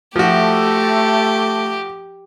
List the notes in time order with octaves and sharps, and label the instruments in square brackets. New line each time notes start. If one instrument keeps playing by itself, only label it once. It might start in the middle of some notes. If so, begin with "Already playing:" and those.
[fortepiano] F3 F#4 [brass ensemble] A3 [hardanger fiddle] G4